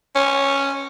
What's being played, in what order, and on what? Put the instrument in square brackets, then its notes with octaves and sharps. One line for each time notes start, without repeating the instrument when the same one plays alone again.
[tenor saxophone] C#4